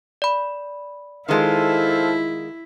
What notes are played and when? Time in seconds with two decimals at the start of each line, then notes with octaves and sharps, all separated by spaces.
0.22 D5 B5
1.28 D#3 G#3 E4 F4 A4 C5 F5